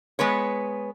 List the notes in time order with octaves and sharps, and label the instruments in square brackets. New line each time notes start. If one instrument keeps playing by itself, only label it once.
[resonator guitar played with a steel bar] G#3 B3 B4 C#5